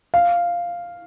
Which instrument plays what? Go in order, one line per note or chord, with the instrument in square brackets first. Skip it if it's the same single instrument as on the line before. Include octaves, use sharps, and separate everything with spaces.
[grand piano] F5